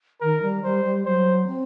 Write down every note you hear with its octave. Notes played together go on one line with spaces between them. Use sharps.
D#3 A#4
G3
G3 C5
G3
F#3 C5
C4